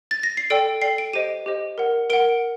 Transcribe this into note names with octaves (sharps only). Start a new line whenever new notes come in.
A6
A#6
C7
A4 D5 G5 D7
A4 D5 G5 C7
D7
G4 C5 D#5 D#7
G4 C5 D#5
A#4 F#5
A#4 F#5 D7